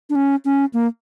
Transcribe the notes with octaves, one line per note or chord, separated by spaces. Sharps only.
D4
C#4
C#4
A#3